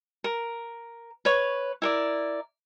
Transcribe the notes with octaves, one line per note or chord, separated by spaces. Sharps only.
A#4
B4 C#5 C#6
E4 A#4 D5